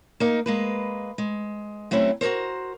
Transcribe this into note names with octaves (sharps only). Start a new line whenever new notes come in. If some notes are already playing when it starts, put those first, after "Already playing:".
A#3 D#4
G#3 A#3 B4
G#3
F#3 A3 C4 C#4 E4
F#4 A4 A#4 C5